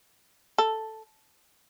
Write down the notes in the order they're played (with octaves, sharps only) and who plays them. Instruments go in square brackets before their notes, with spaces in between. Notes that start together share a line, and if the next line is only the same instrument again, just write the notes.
[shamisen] A4